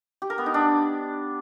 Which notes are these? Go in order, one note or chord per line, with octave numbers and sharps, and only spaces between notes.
G4
A#4
B3
D#4
D4